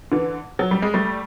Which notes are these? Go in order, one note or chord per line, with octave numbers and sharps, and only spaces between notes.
D3 E3
F#3
G3
G#3
G3 A3